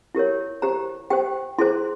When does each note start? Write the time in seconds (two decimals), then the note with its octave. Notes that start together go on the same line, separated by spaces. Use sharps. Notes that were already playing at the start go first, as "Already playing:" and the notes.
0.15 E4 G4 A#4 C#5
0.62 G4 C5 A#5
1.10 G4 C5 G5
1.58 E4 G#4 C5 C6